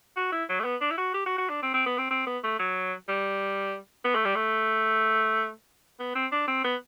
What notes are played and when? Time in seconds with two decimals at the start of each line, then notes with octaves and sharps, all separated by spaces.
0.16 F#4
0.32 E4
0.49 F#3
0.60 A3
0.64 B3
0.81 D4
0.91 E4
0.97 F#4
1.14 G4
1.26 F#4
1.38 F#4
1.49 D4
1.63 C4
1.74 C4
1.86 B3
1.98 C4
2.11 C4
2.26 B3
2.44 A3
2.59 F#3
3.08 G3
4.04 B3
4.15 A3
4.25 G3
4.35 A3
6.00 B3
6.15 C4
6.32 D4
6.48 C4
6.64 B3